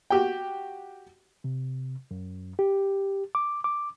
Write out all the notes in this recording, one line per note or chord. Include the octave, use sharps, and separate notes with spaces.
F#4 G4 G5
C3
F#2
G4
D6
D6